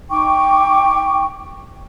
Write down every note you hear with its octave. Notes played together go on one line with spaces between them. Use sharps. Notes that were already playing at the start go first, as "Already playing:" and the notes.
D#4 G5 C#6 D6